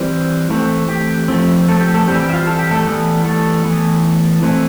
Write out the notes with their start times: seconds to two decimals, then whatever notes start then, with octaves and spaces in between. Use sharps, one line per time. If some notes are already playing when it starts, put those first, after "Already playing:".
Already playing: E3 G3 C4 C5
0.50 E3 A3 C4
0.89 G4
1.28 F3 A3 C4
1.68 A3 A4
1.80 G4
1.94 A3 A4
2.07 E3 G3 C4 G4
2.20 G4
2.30 E5
2.33 F4 F5
2.47 A4
2.59 G4
2.71 A3 A4
2.86 E3 G3 B3
3.25 A3 A4
3.65 E3 B3
4.43 E3 A3 C4